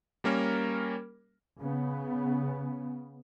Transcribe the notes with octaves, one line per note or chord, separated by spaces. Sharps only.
G3 A#3 C#4 A#4
C#3 B3